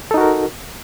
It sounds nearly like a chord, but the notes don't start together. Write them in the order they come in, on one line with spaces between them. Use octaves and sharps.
A4 D#4 F#4 A#4